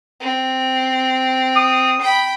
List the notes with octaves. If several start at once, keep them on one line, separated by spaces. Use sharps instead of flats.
C4
D#6
G5 B5